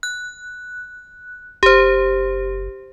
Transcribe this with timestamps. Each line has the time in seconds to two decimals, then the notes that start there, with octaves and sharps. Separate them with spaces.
0.03 F#6
1.63 F#1 G4 C5